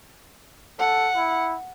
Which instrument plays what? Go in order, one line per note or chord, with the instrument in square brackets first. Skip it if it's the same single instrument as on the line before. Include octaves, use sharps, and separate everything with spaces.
[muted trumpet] A4 [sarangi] F#5
[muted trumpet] E4